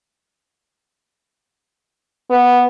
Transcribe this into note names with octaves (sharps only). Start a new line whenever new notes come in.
B3